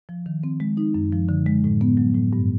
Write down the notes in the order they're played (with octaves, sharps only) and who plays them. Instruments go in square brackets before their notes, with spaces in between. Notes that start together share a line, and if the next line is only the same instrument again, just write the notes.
[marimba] F3
D#3
C4
G#3
D#4
F#2
F3
D3
G#3
A2
B3
F#3
A2
G2